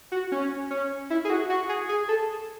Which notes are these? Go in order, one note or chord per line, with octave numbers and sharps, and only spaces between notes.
F#4
C#4
C#4
E4
G#4
F#4
F#4
G#4
G#4
A4